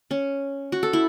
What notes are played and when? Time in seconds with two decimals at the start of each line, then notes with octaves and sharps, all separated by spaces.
0.11 C#4
0.72 F#4
0.83 A4
0.93 E4